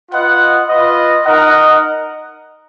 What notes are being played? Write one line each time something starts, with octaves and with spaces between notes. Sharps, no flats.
F4 B4 D#5 F#5
F4 B4 D#5
D#4 A#4 D#5 F#5